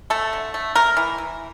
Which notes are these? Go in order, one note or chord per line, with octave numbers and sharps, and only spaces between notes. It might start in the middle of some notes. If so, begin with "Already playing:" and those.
A3 A4
D3
A3
A3 A#4
E3
E3